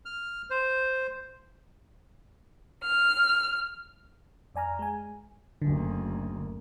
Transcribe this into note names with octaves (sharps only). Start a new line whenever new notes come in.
F6
C5
F6
F2 D5 G#5 A#5 F6
G#3 G#5
F#1 D2 D3